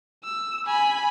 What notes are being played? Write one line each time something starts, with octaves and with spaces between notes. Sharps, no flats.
E6
G#5 B5